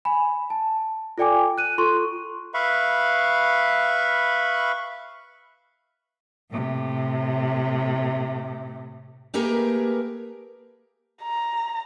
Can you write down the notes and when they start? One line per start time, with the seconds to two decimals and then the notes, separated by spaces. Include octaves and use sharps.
0.05 G#5 B5
0.50 A5
1.18 F4 A4 D5 G5 G#5 D6
1.58 F#6 D#7
1.78 F4 A4 C6 C#6
2.54 B4 E5 F5 B5 C#6
6.51 A2 C3
9.34 A3 A#3 G4 G#4 A#4 B4
11.23 A#5